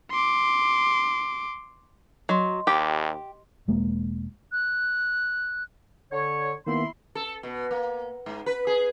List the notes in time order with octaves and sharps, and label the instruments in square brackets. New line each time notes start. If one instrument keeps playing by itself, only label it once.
[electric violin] C6 D6
[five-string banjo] F#3 [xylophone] D#5 C6
[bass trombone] D#2 [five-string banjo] G4
[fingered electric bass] E1 G#3 A#3
[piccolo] F#6
[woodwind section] D3 C#5
[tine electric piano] D#3 A#3 B3 [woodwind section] E4 B5 C6
[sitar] A4
B2
A#3
G#2
B4
G#4